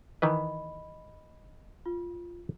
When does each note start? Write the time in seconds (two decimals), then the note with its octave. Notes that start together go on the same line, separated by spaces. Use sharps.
0.22 D#3 E3 B4 D#5 B5
1.86 F4